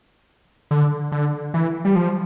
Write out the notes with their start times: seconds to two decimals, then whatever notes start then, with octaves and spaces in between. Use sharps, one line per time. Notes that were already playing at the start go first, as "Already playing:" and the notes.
0.71 D3
1.12 D3
1.54 E3
1.85 G3
1.95 F3